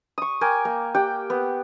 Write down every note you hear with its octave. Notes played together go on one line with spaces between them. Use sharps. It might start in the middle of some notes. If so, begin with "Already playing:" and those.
C#6 D#6
A#4 G5 G#5 D6
A#3
G4 F#5 G5
B3